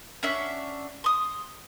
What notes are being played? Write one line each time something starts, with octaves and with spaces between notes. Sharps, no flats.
C#4 D4 E5 F#5
C6 D#6